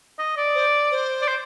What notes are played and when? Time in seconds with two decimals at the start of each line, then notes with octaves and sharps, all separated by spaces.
0.19 D#5
0.37 D5
0.55 C5
0.92 C5
1.22 D5
1.28 C5